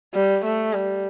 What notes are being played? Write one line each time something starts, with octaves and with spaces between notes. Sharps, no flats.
G3
A3
G3